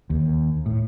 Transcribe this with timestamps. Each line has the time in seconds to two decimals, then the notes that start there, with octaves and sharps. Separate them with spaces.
0.10 D#2
0.66 A2